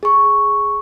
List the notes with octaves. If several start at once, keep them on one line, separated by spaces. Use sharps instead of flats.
G#4 C#6